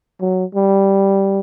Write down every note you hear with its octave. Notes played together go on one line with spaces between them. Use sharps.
F#3
G3